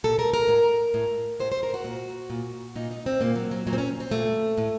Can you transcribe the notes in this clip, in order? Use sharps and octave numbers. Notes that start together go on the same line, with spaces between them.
A#2 A4
A#4
A#4
A2
A2
A2 C5
C5
A#4
F#4
A#2
A#2
A#2 D#4
D#4
C4
A#2 A#3
F#3
F#3
A#2 F#3
C4
C#4
C4
A#2 A3
A2